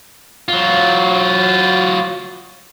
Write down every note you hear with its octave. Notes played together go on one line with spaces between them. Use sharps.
F#3 F4